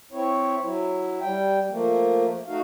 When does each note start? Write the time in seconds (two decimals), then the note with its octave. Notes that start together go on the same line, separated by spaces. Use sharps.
0.12 C4 E4 C#5
0.63 F#3 E4
1.21 G3 G5
1.70 F3 A3 A#3
2.47 A3 D#4 F#4 F5